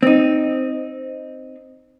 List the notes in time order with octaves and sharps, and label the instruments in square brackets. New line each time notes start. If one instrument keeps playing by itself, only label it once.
[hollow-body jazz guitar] C4 D#4